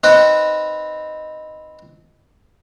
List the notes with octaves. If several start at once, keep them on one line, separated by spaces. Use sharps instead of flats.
C4 D#4 B4